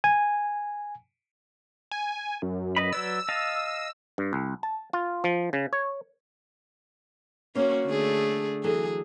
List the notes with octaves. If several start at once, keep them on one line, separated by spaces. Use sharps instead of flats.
G#5
G#5
F#2
B4 D#5 B5
F#3 B4 D5 E6
D#5 F5 A5
G2
C2
A5
F4
F3
C#3
C#5
A#3 C#4 F#4 C5 C#5
D3 A3 G#4
E3 F#3 G#4 A4